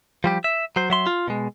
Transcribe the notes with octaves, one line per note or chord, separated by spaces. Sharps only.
F3 G3 G4
E5
F#3 C5
F#3 E5 C6
F4
B2 G#3